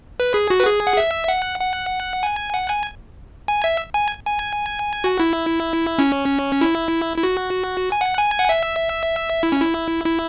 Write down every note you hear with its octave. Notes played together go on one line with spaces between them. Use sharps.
B4
G#4
F#4
B4
G#4
F#5
E5
F#5
F#5
G#5
F#5
G#5
G#5
E5
G#5
G#5
F#4
E4
C#4
E4
E4
F#4
G#5
F#5
G#5
F#5
E5
E4
C#4
E4
E4